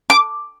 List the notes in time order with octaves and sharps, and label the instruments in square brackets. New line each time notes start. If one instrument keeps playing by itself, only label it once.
[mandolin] D6